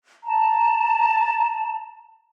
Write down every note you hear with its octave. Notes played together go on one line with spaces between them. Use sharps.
A5 A#5